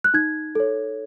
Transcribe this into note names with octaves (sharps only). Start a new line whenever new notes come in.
F#6
D#4 G#6
A4 C#5